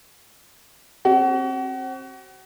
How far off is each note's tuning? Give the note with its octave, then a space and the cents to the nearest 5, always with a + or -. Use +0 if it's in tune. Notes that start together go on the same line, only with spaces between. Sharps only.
C4 +30 F#4 +30